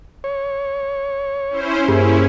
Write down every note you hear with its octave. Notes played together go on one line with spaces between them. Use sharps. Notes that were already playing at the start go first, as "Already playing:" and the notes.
C#5
C#4 E4 C5
G2 A#3 C#4 E4 G#4 C5